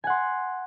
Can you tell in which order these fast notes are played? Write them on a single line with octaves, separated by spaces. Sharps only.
G#5 F#5 C6